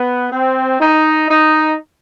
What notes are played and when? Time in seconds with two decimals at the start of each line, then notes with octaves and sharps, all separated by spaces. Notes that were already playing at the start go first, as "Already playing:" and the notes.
Already playing: B3
0.31 C4
0.81 D#4
1.29 D#4